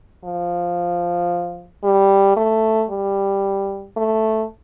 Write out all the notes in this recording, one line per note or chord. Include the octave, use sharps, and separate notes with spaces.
F3
G3
A3
G3
A3